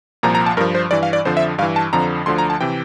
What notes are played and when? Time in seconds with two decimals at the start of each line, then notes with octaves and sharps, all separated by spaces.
0.23 C2 A#2 F3 A#5
0.35 A#5
0.46 A5
0.57 G2 A#4
0.61 F3
0.75 C5
0.91 G2 E3 D5
1.03 F5
1.13 D5
1.25 F2 D3 F3 C5
1.37 E5
1.58 G2 F5
1.62 E3
1.76 A5
1.93 F2 D3 F3 A#5
2.26 D2 D3 F3 C6
2.38 A#5
2.50 A5
2.60 C3 E3 G5